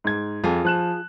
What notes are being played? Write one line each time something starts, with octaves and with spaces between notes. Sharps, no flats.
G#2 G#6
F2 F4 G#4
F3 F#6 E7